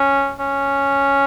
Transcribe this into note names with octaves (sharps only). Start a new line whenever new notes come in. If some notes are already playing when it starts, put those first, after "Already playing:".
Already playing: C#4
C#4